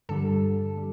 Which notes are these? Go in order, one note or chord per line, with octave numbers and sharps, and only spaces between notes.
G2 D3 G3 A4
G3